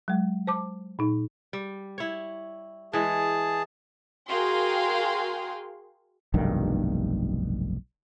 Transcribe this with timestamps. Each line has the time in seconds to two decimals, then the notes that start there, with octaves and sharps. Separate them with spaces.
0.08 F#3 G#3
0.47 C5 A5 D6
0.99 A#2 D#4
1.53 G3
1.98 E4 C#5
2.93 E3 G#3 G#4 A5
4.29 F#4 G#4 A#4 F5 G5 C6
6.34 F1 B1 G2 D#3